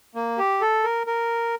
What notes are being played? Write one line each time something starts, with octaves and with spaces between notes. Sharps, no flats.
A#3
G4
A4
A#4
A#4